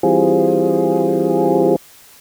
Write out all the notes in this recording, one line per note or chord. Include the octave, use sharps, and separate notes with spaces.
E3 G3 C4 F4 G#4